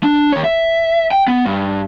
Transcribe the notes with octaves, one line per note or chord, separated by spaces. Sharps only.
D4
D#2 C#5
E5
G5
B3
G2